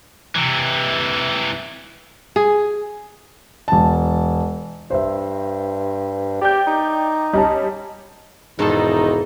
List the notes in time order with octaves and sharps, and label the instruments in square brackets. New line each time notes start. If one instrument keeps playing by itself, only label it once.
[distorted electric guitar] C3 E3
[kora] G#4
[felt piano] E1 A5
[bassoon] G2 [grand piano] C5 E5
[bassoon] G4 [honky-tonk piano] D5 G5 G6
[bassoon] D#4
[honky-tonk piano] G3 C#4 [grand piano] D#5 A5
[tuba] E1 [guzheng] G#2 A4 A5 [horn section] D#3 D#4 E4